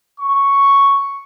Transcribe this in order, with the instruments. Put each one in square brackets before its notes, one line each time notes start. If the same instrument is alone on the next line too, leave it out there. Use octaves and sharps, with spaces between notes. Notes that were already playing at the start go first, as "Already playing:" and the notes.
[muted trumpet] C#6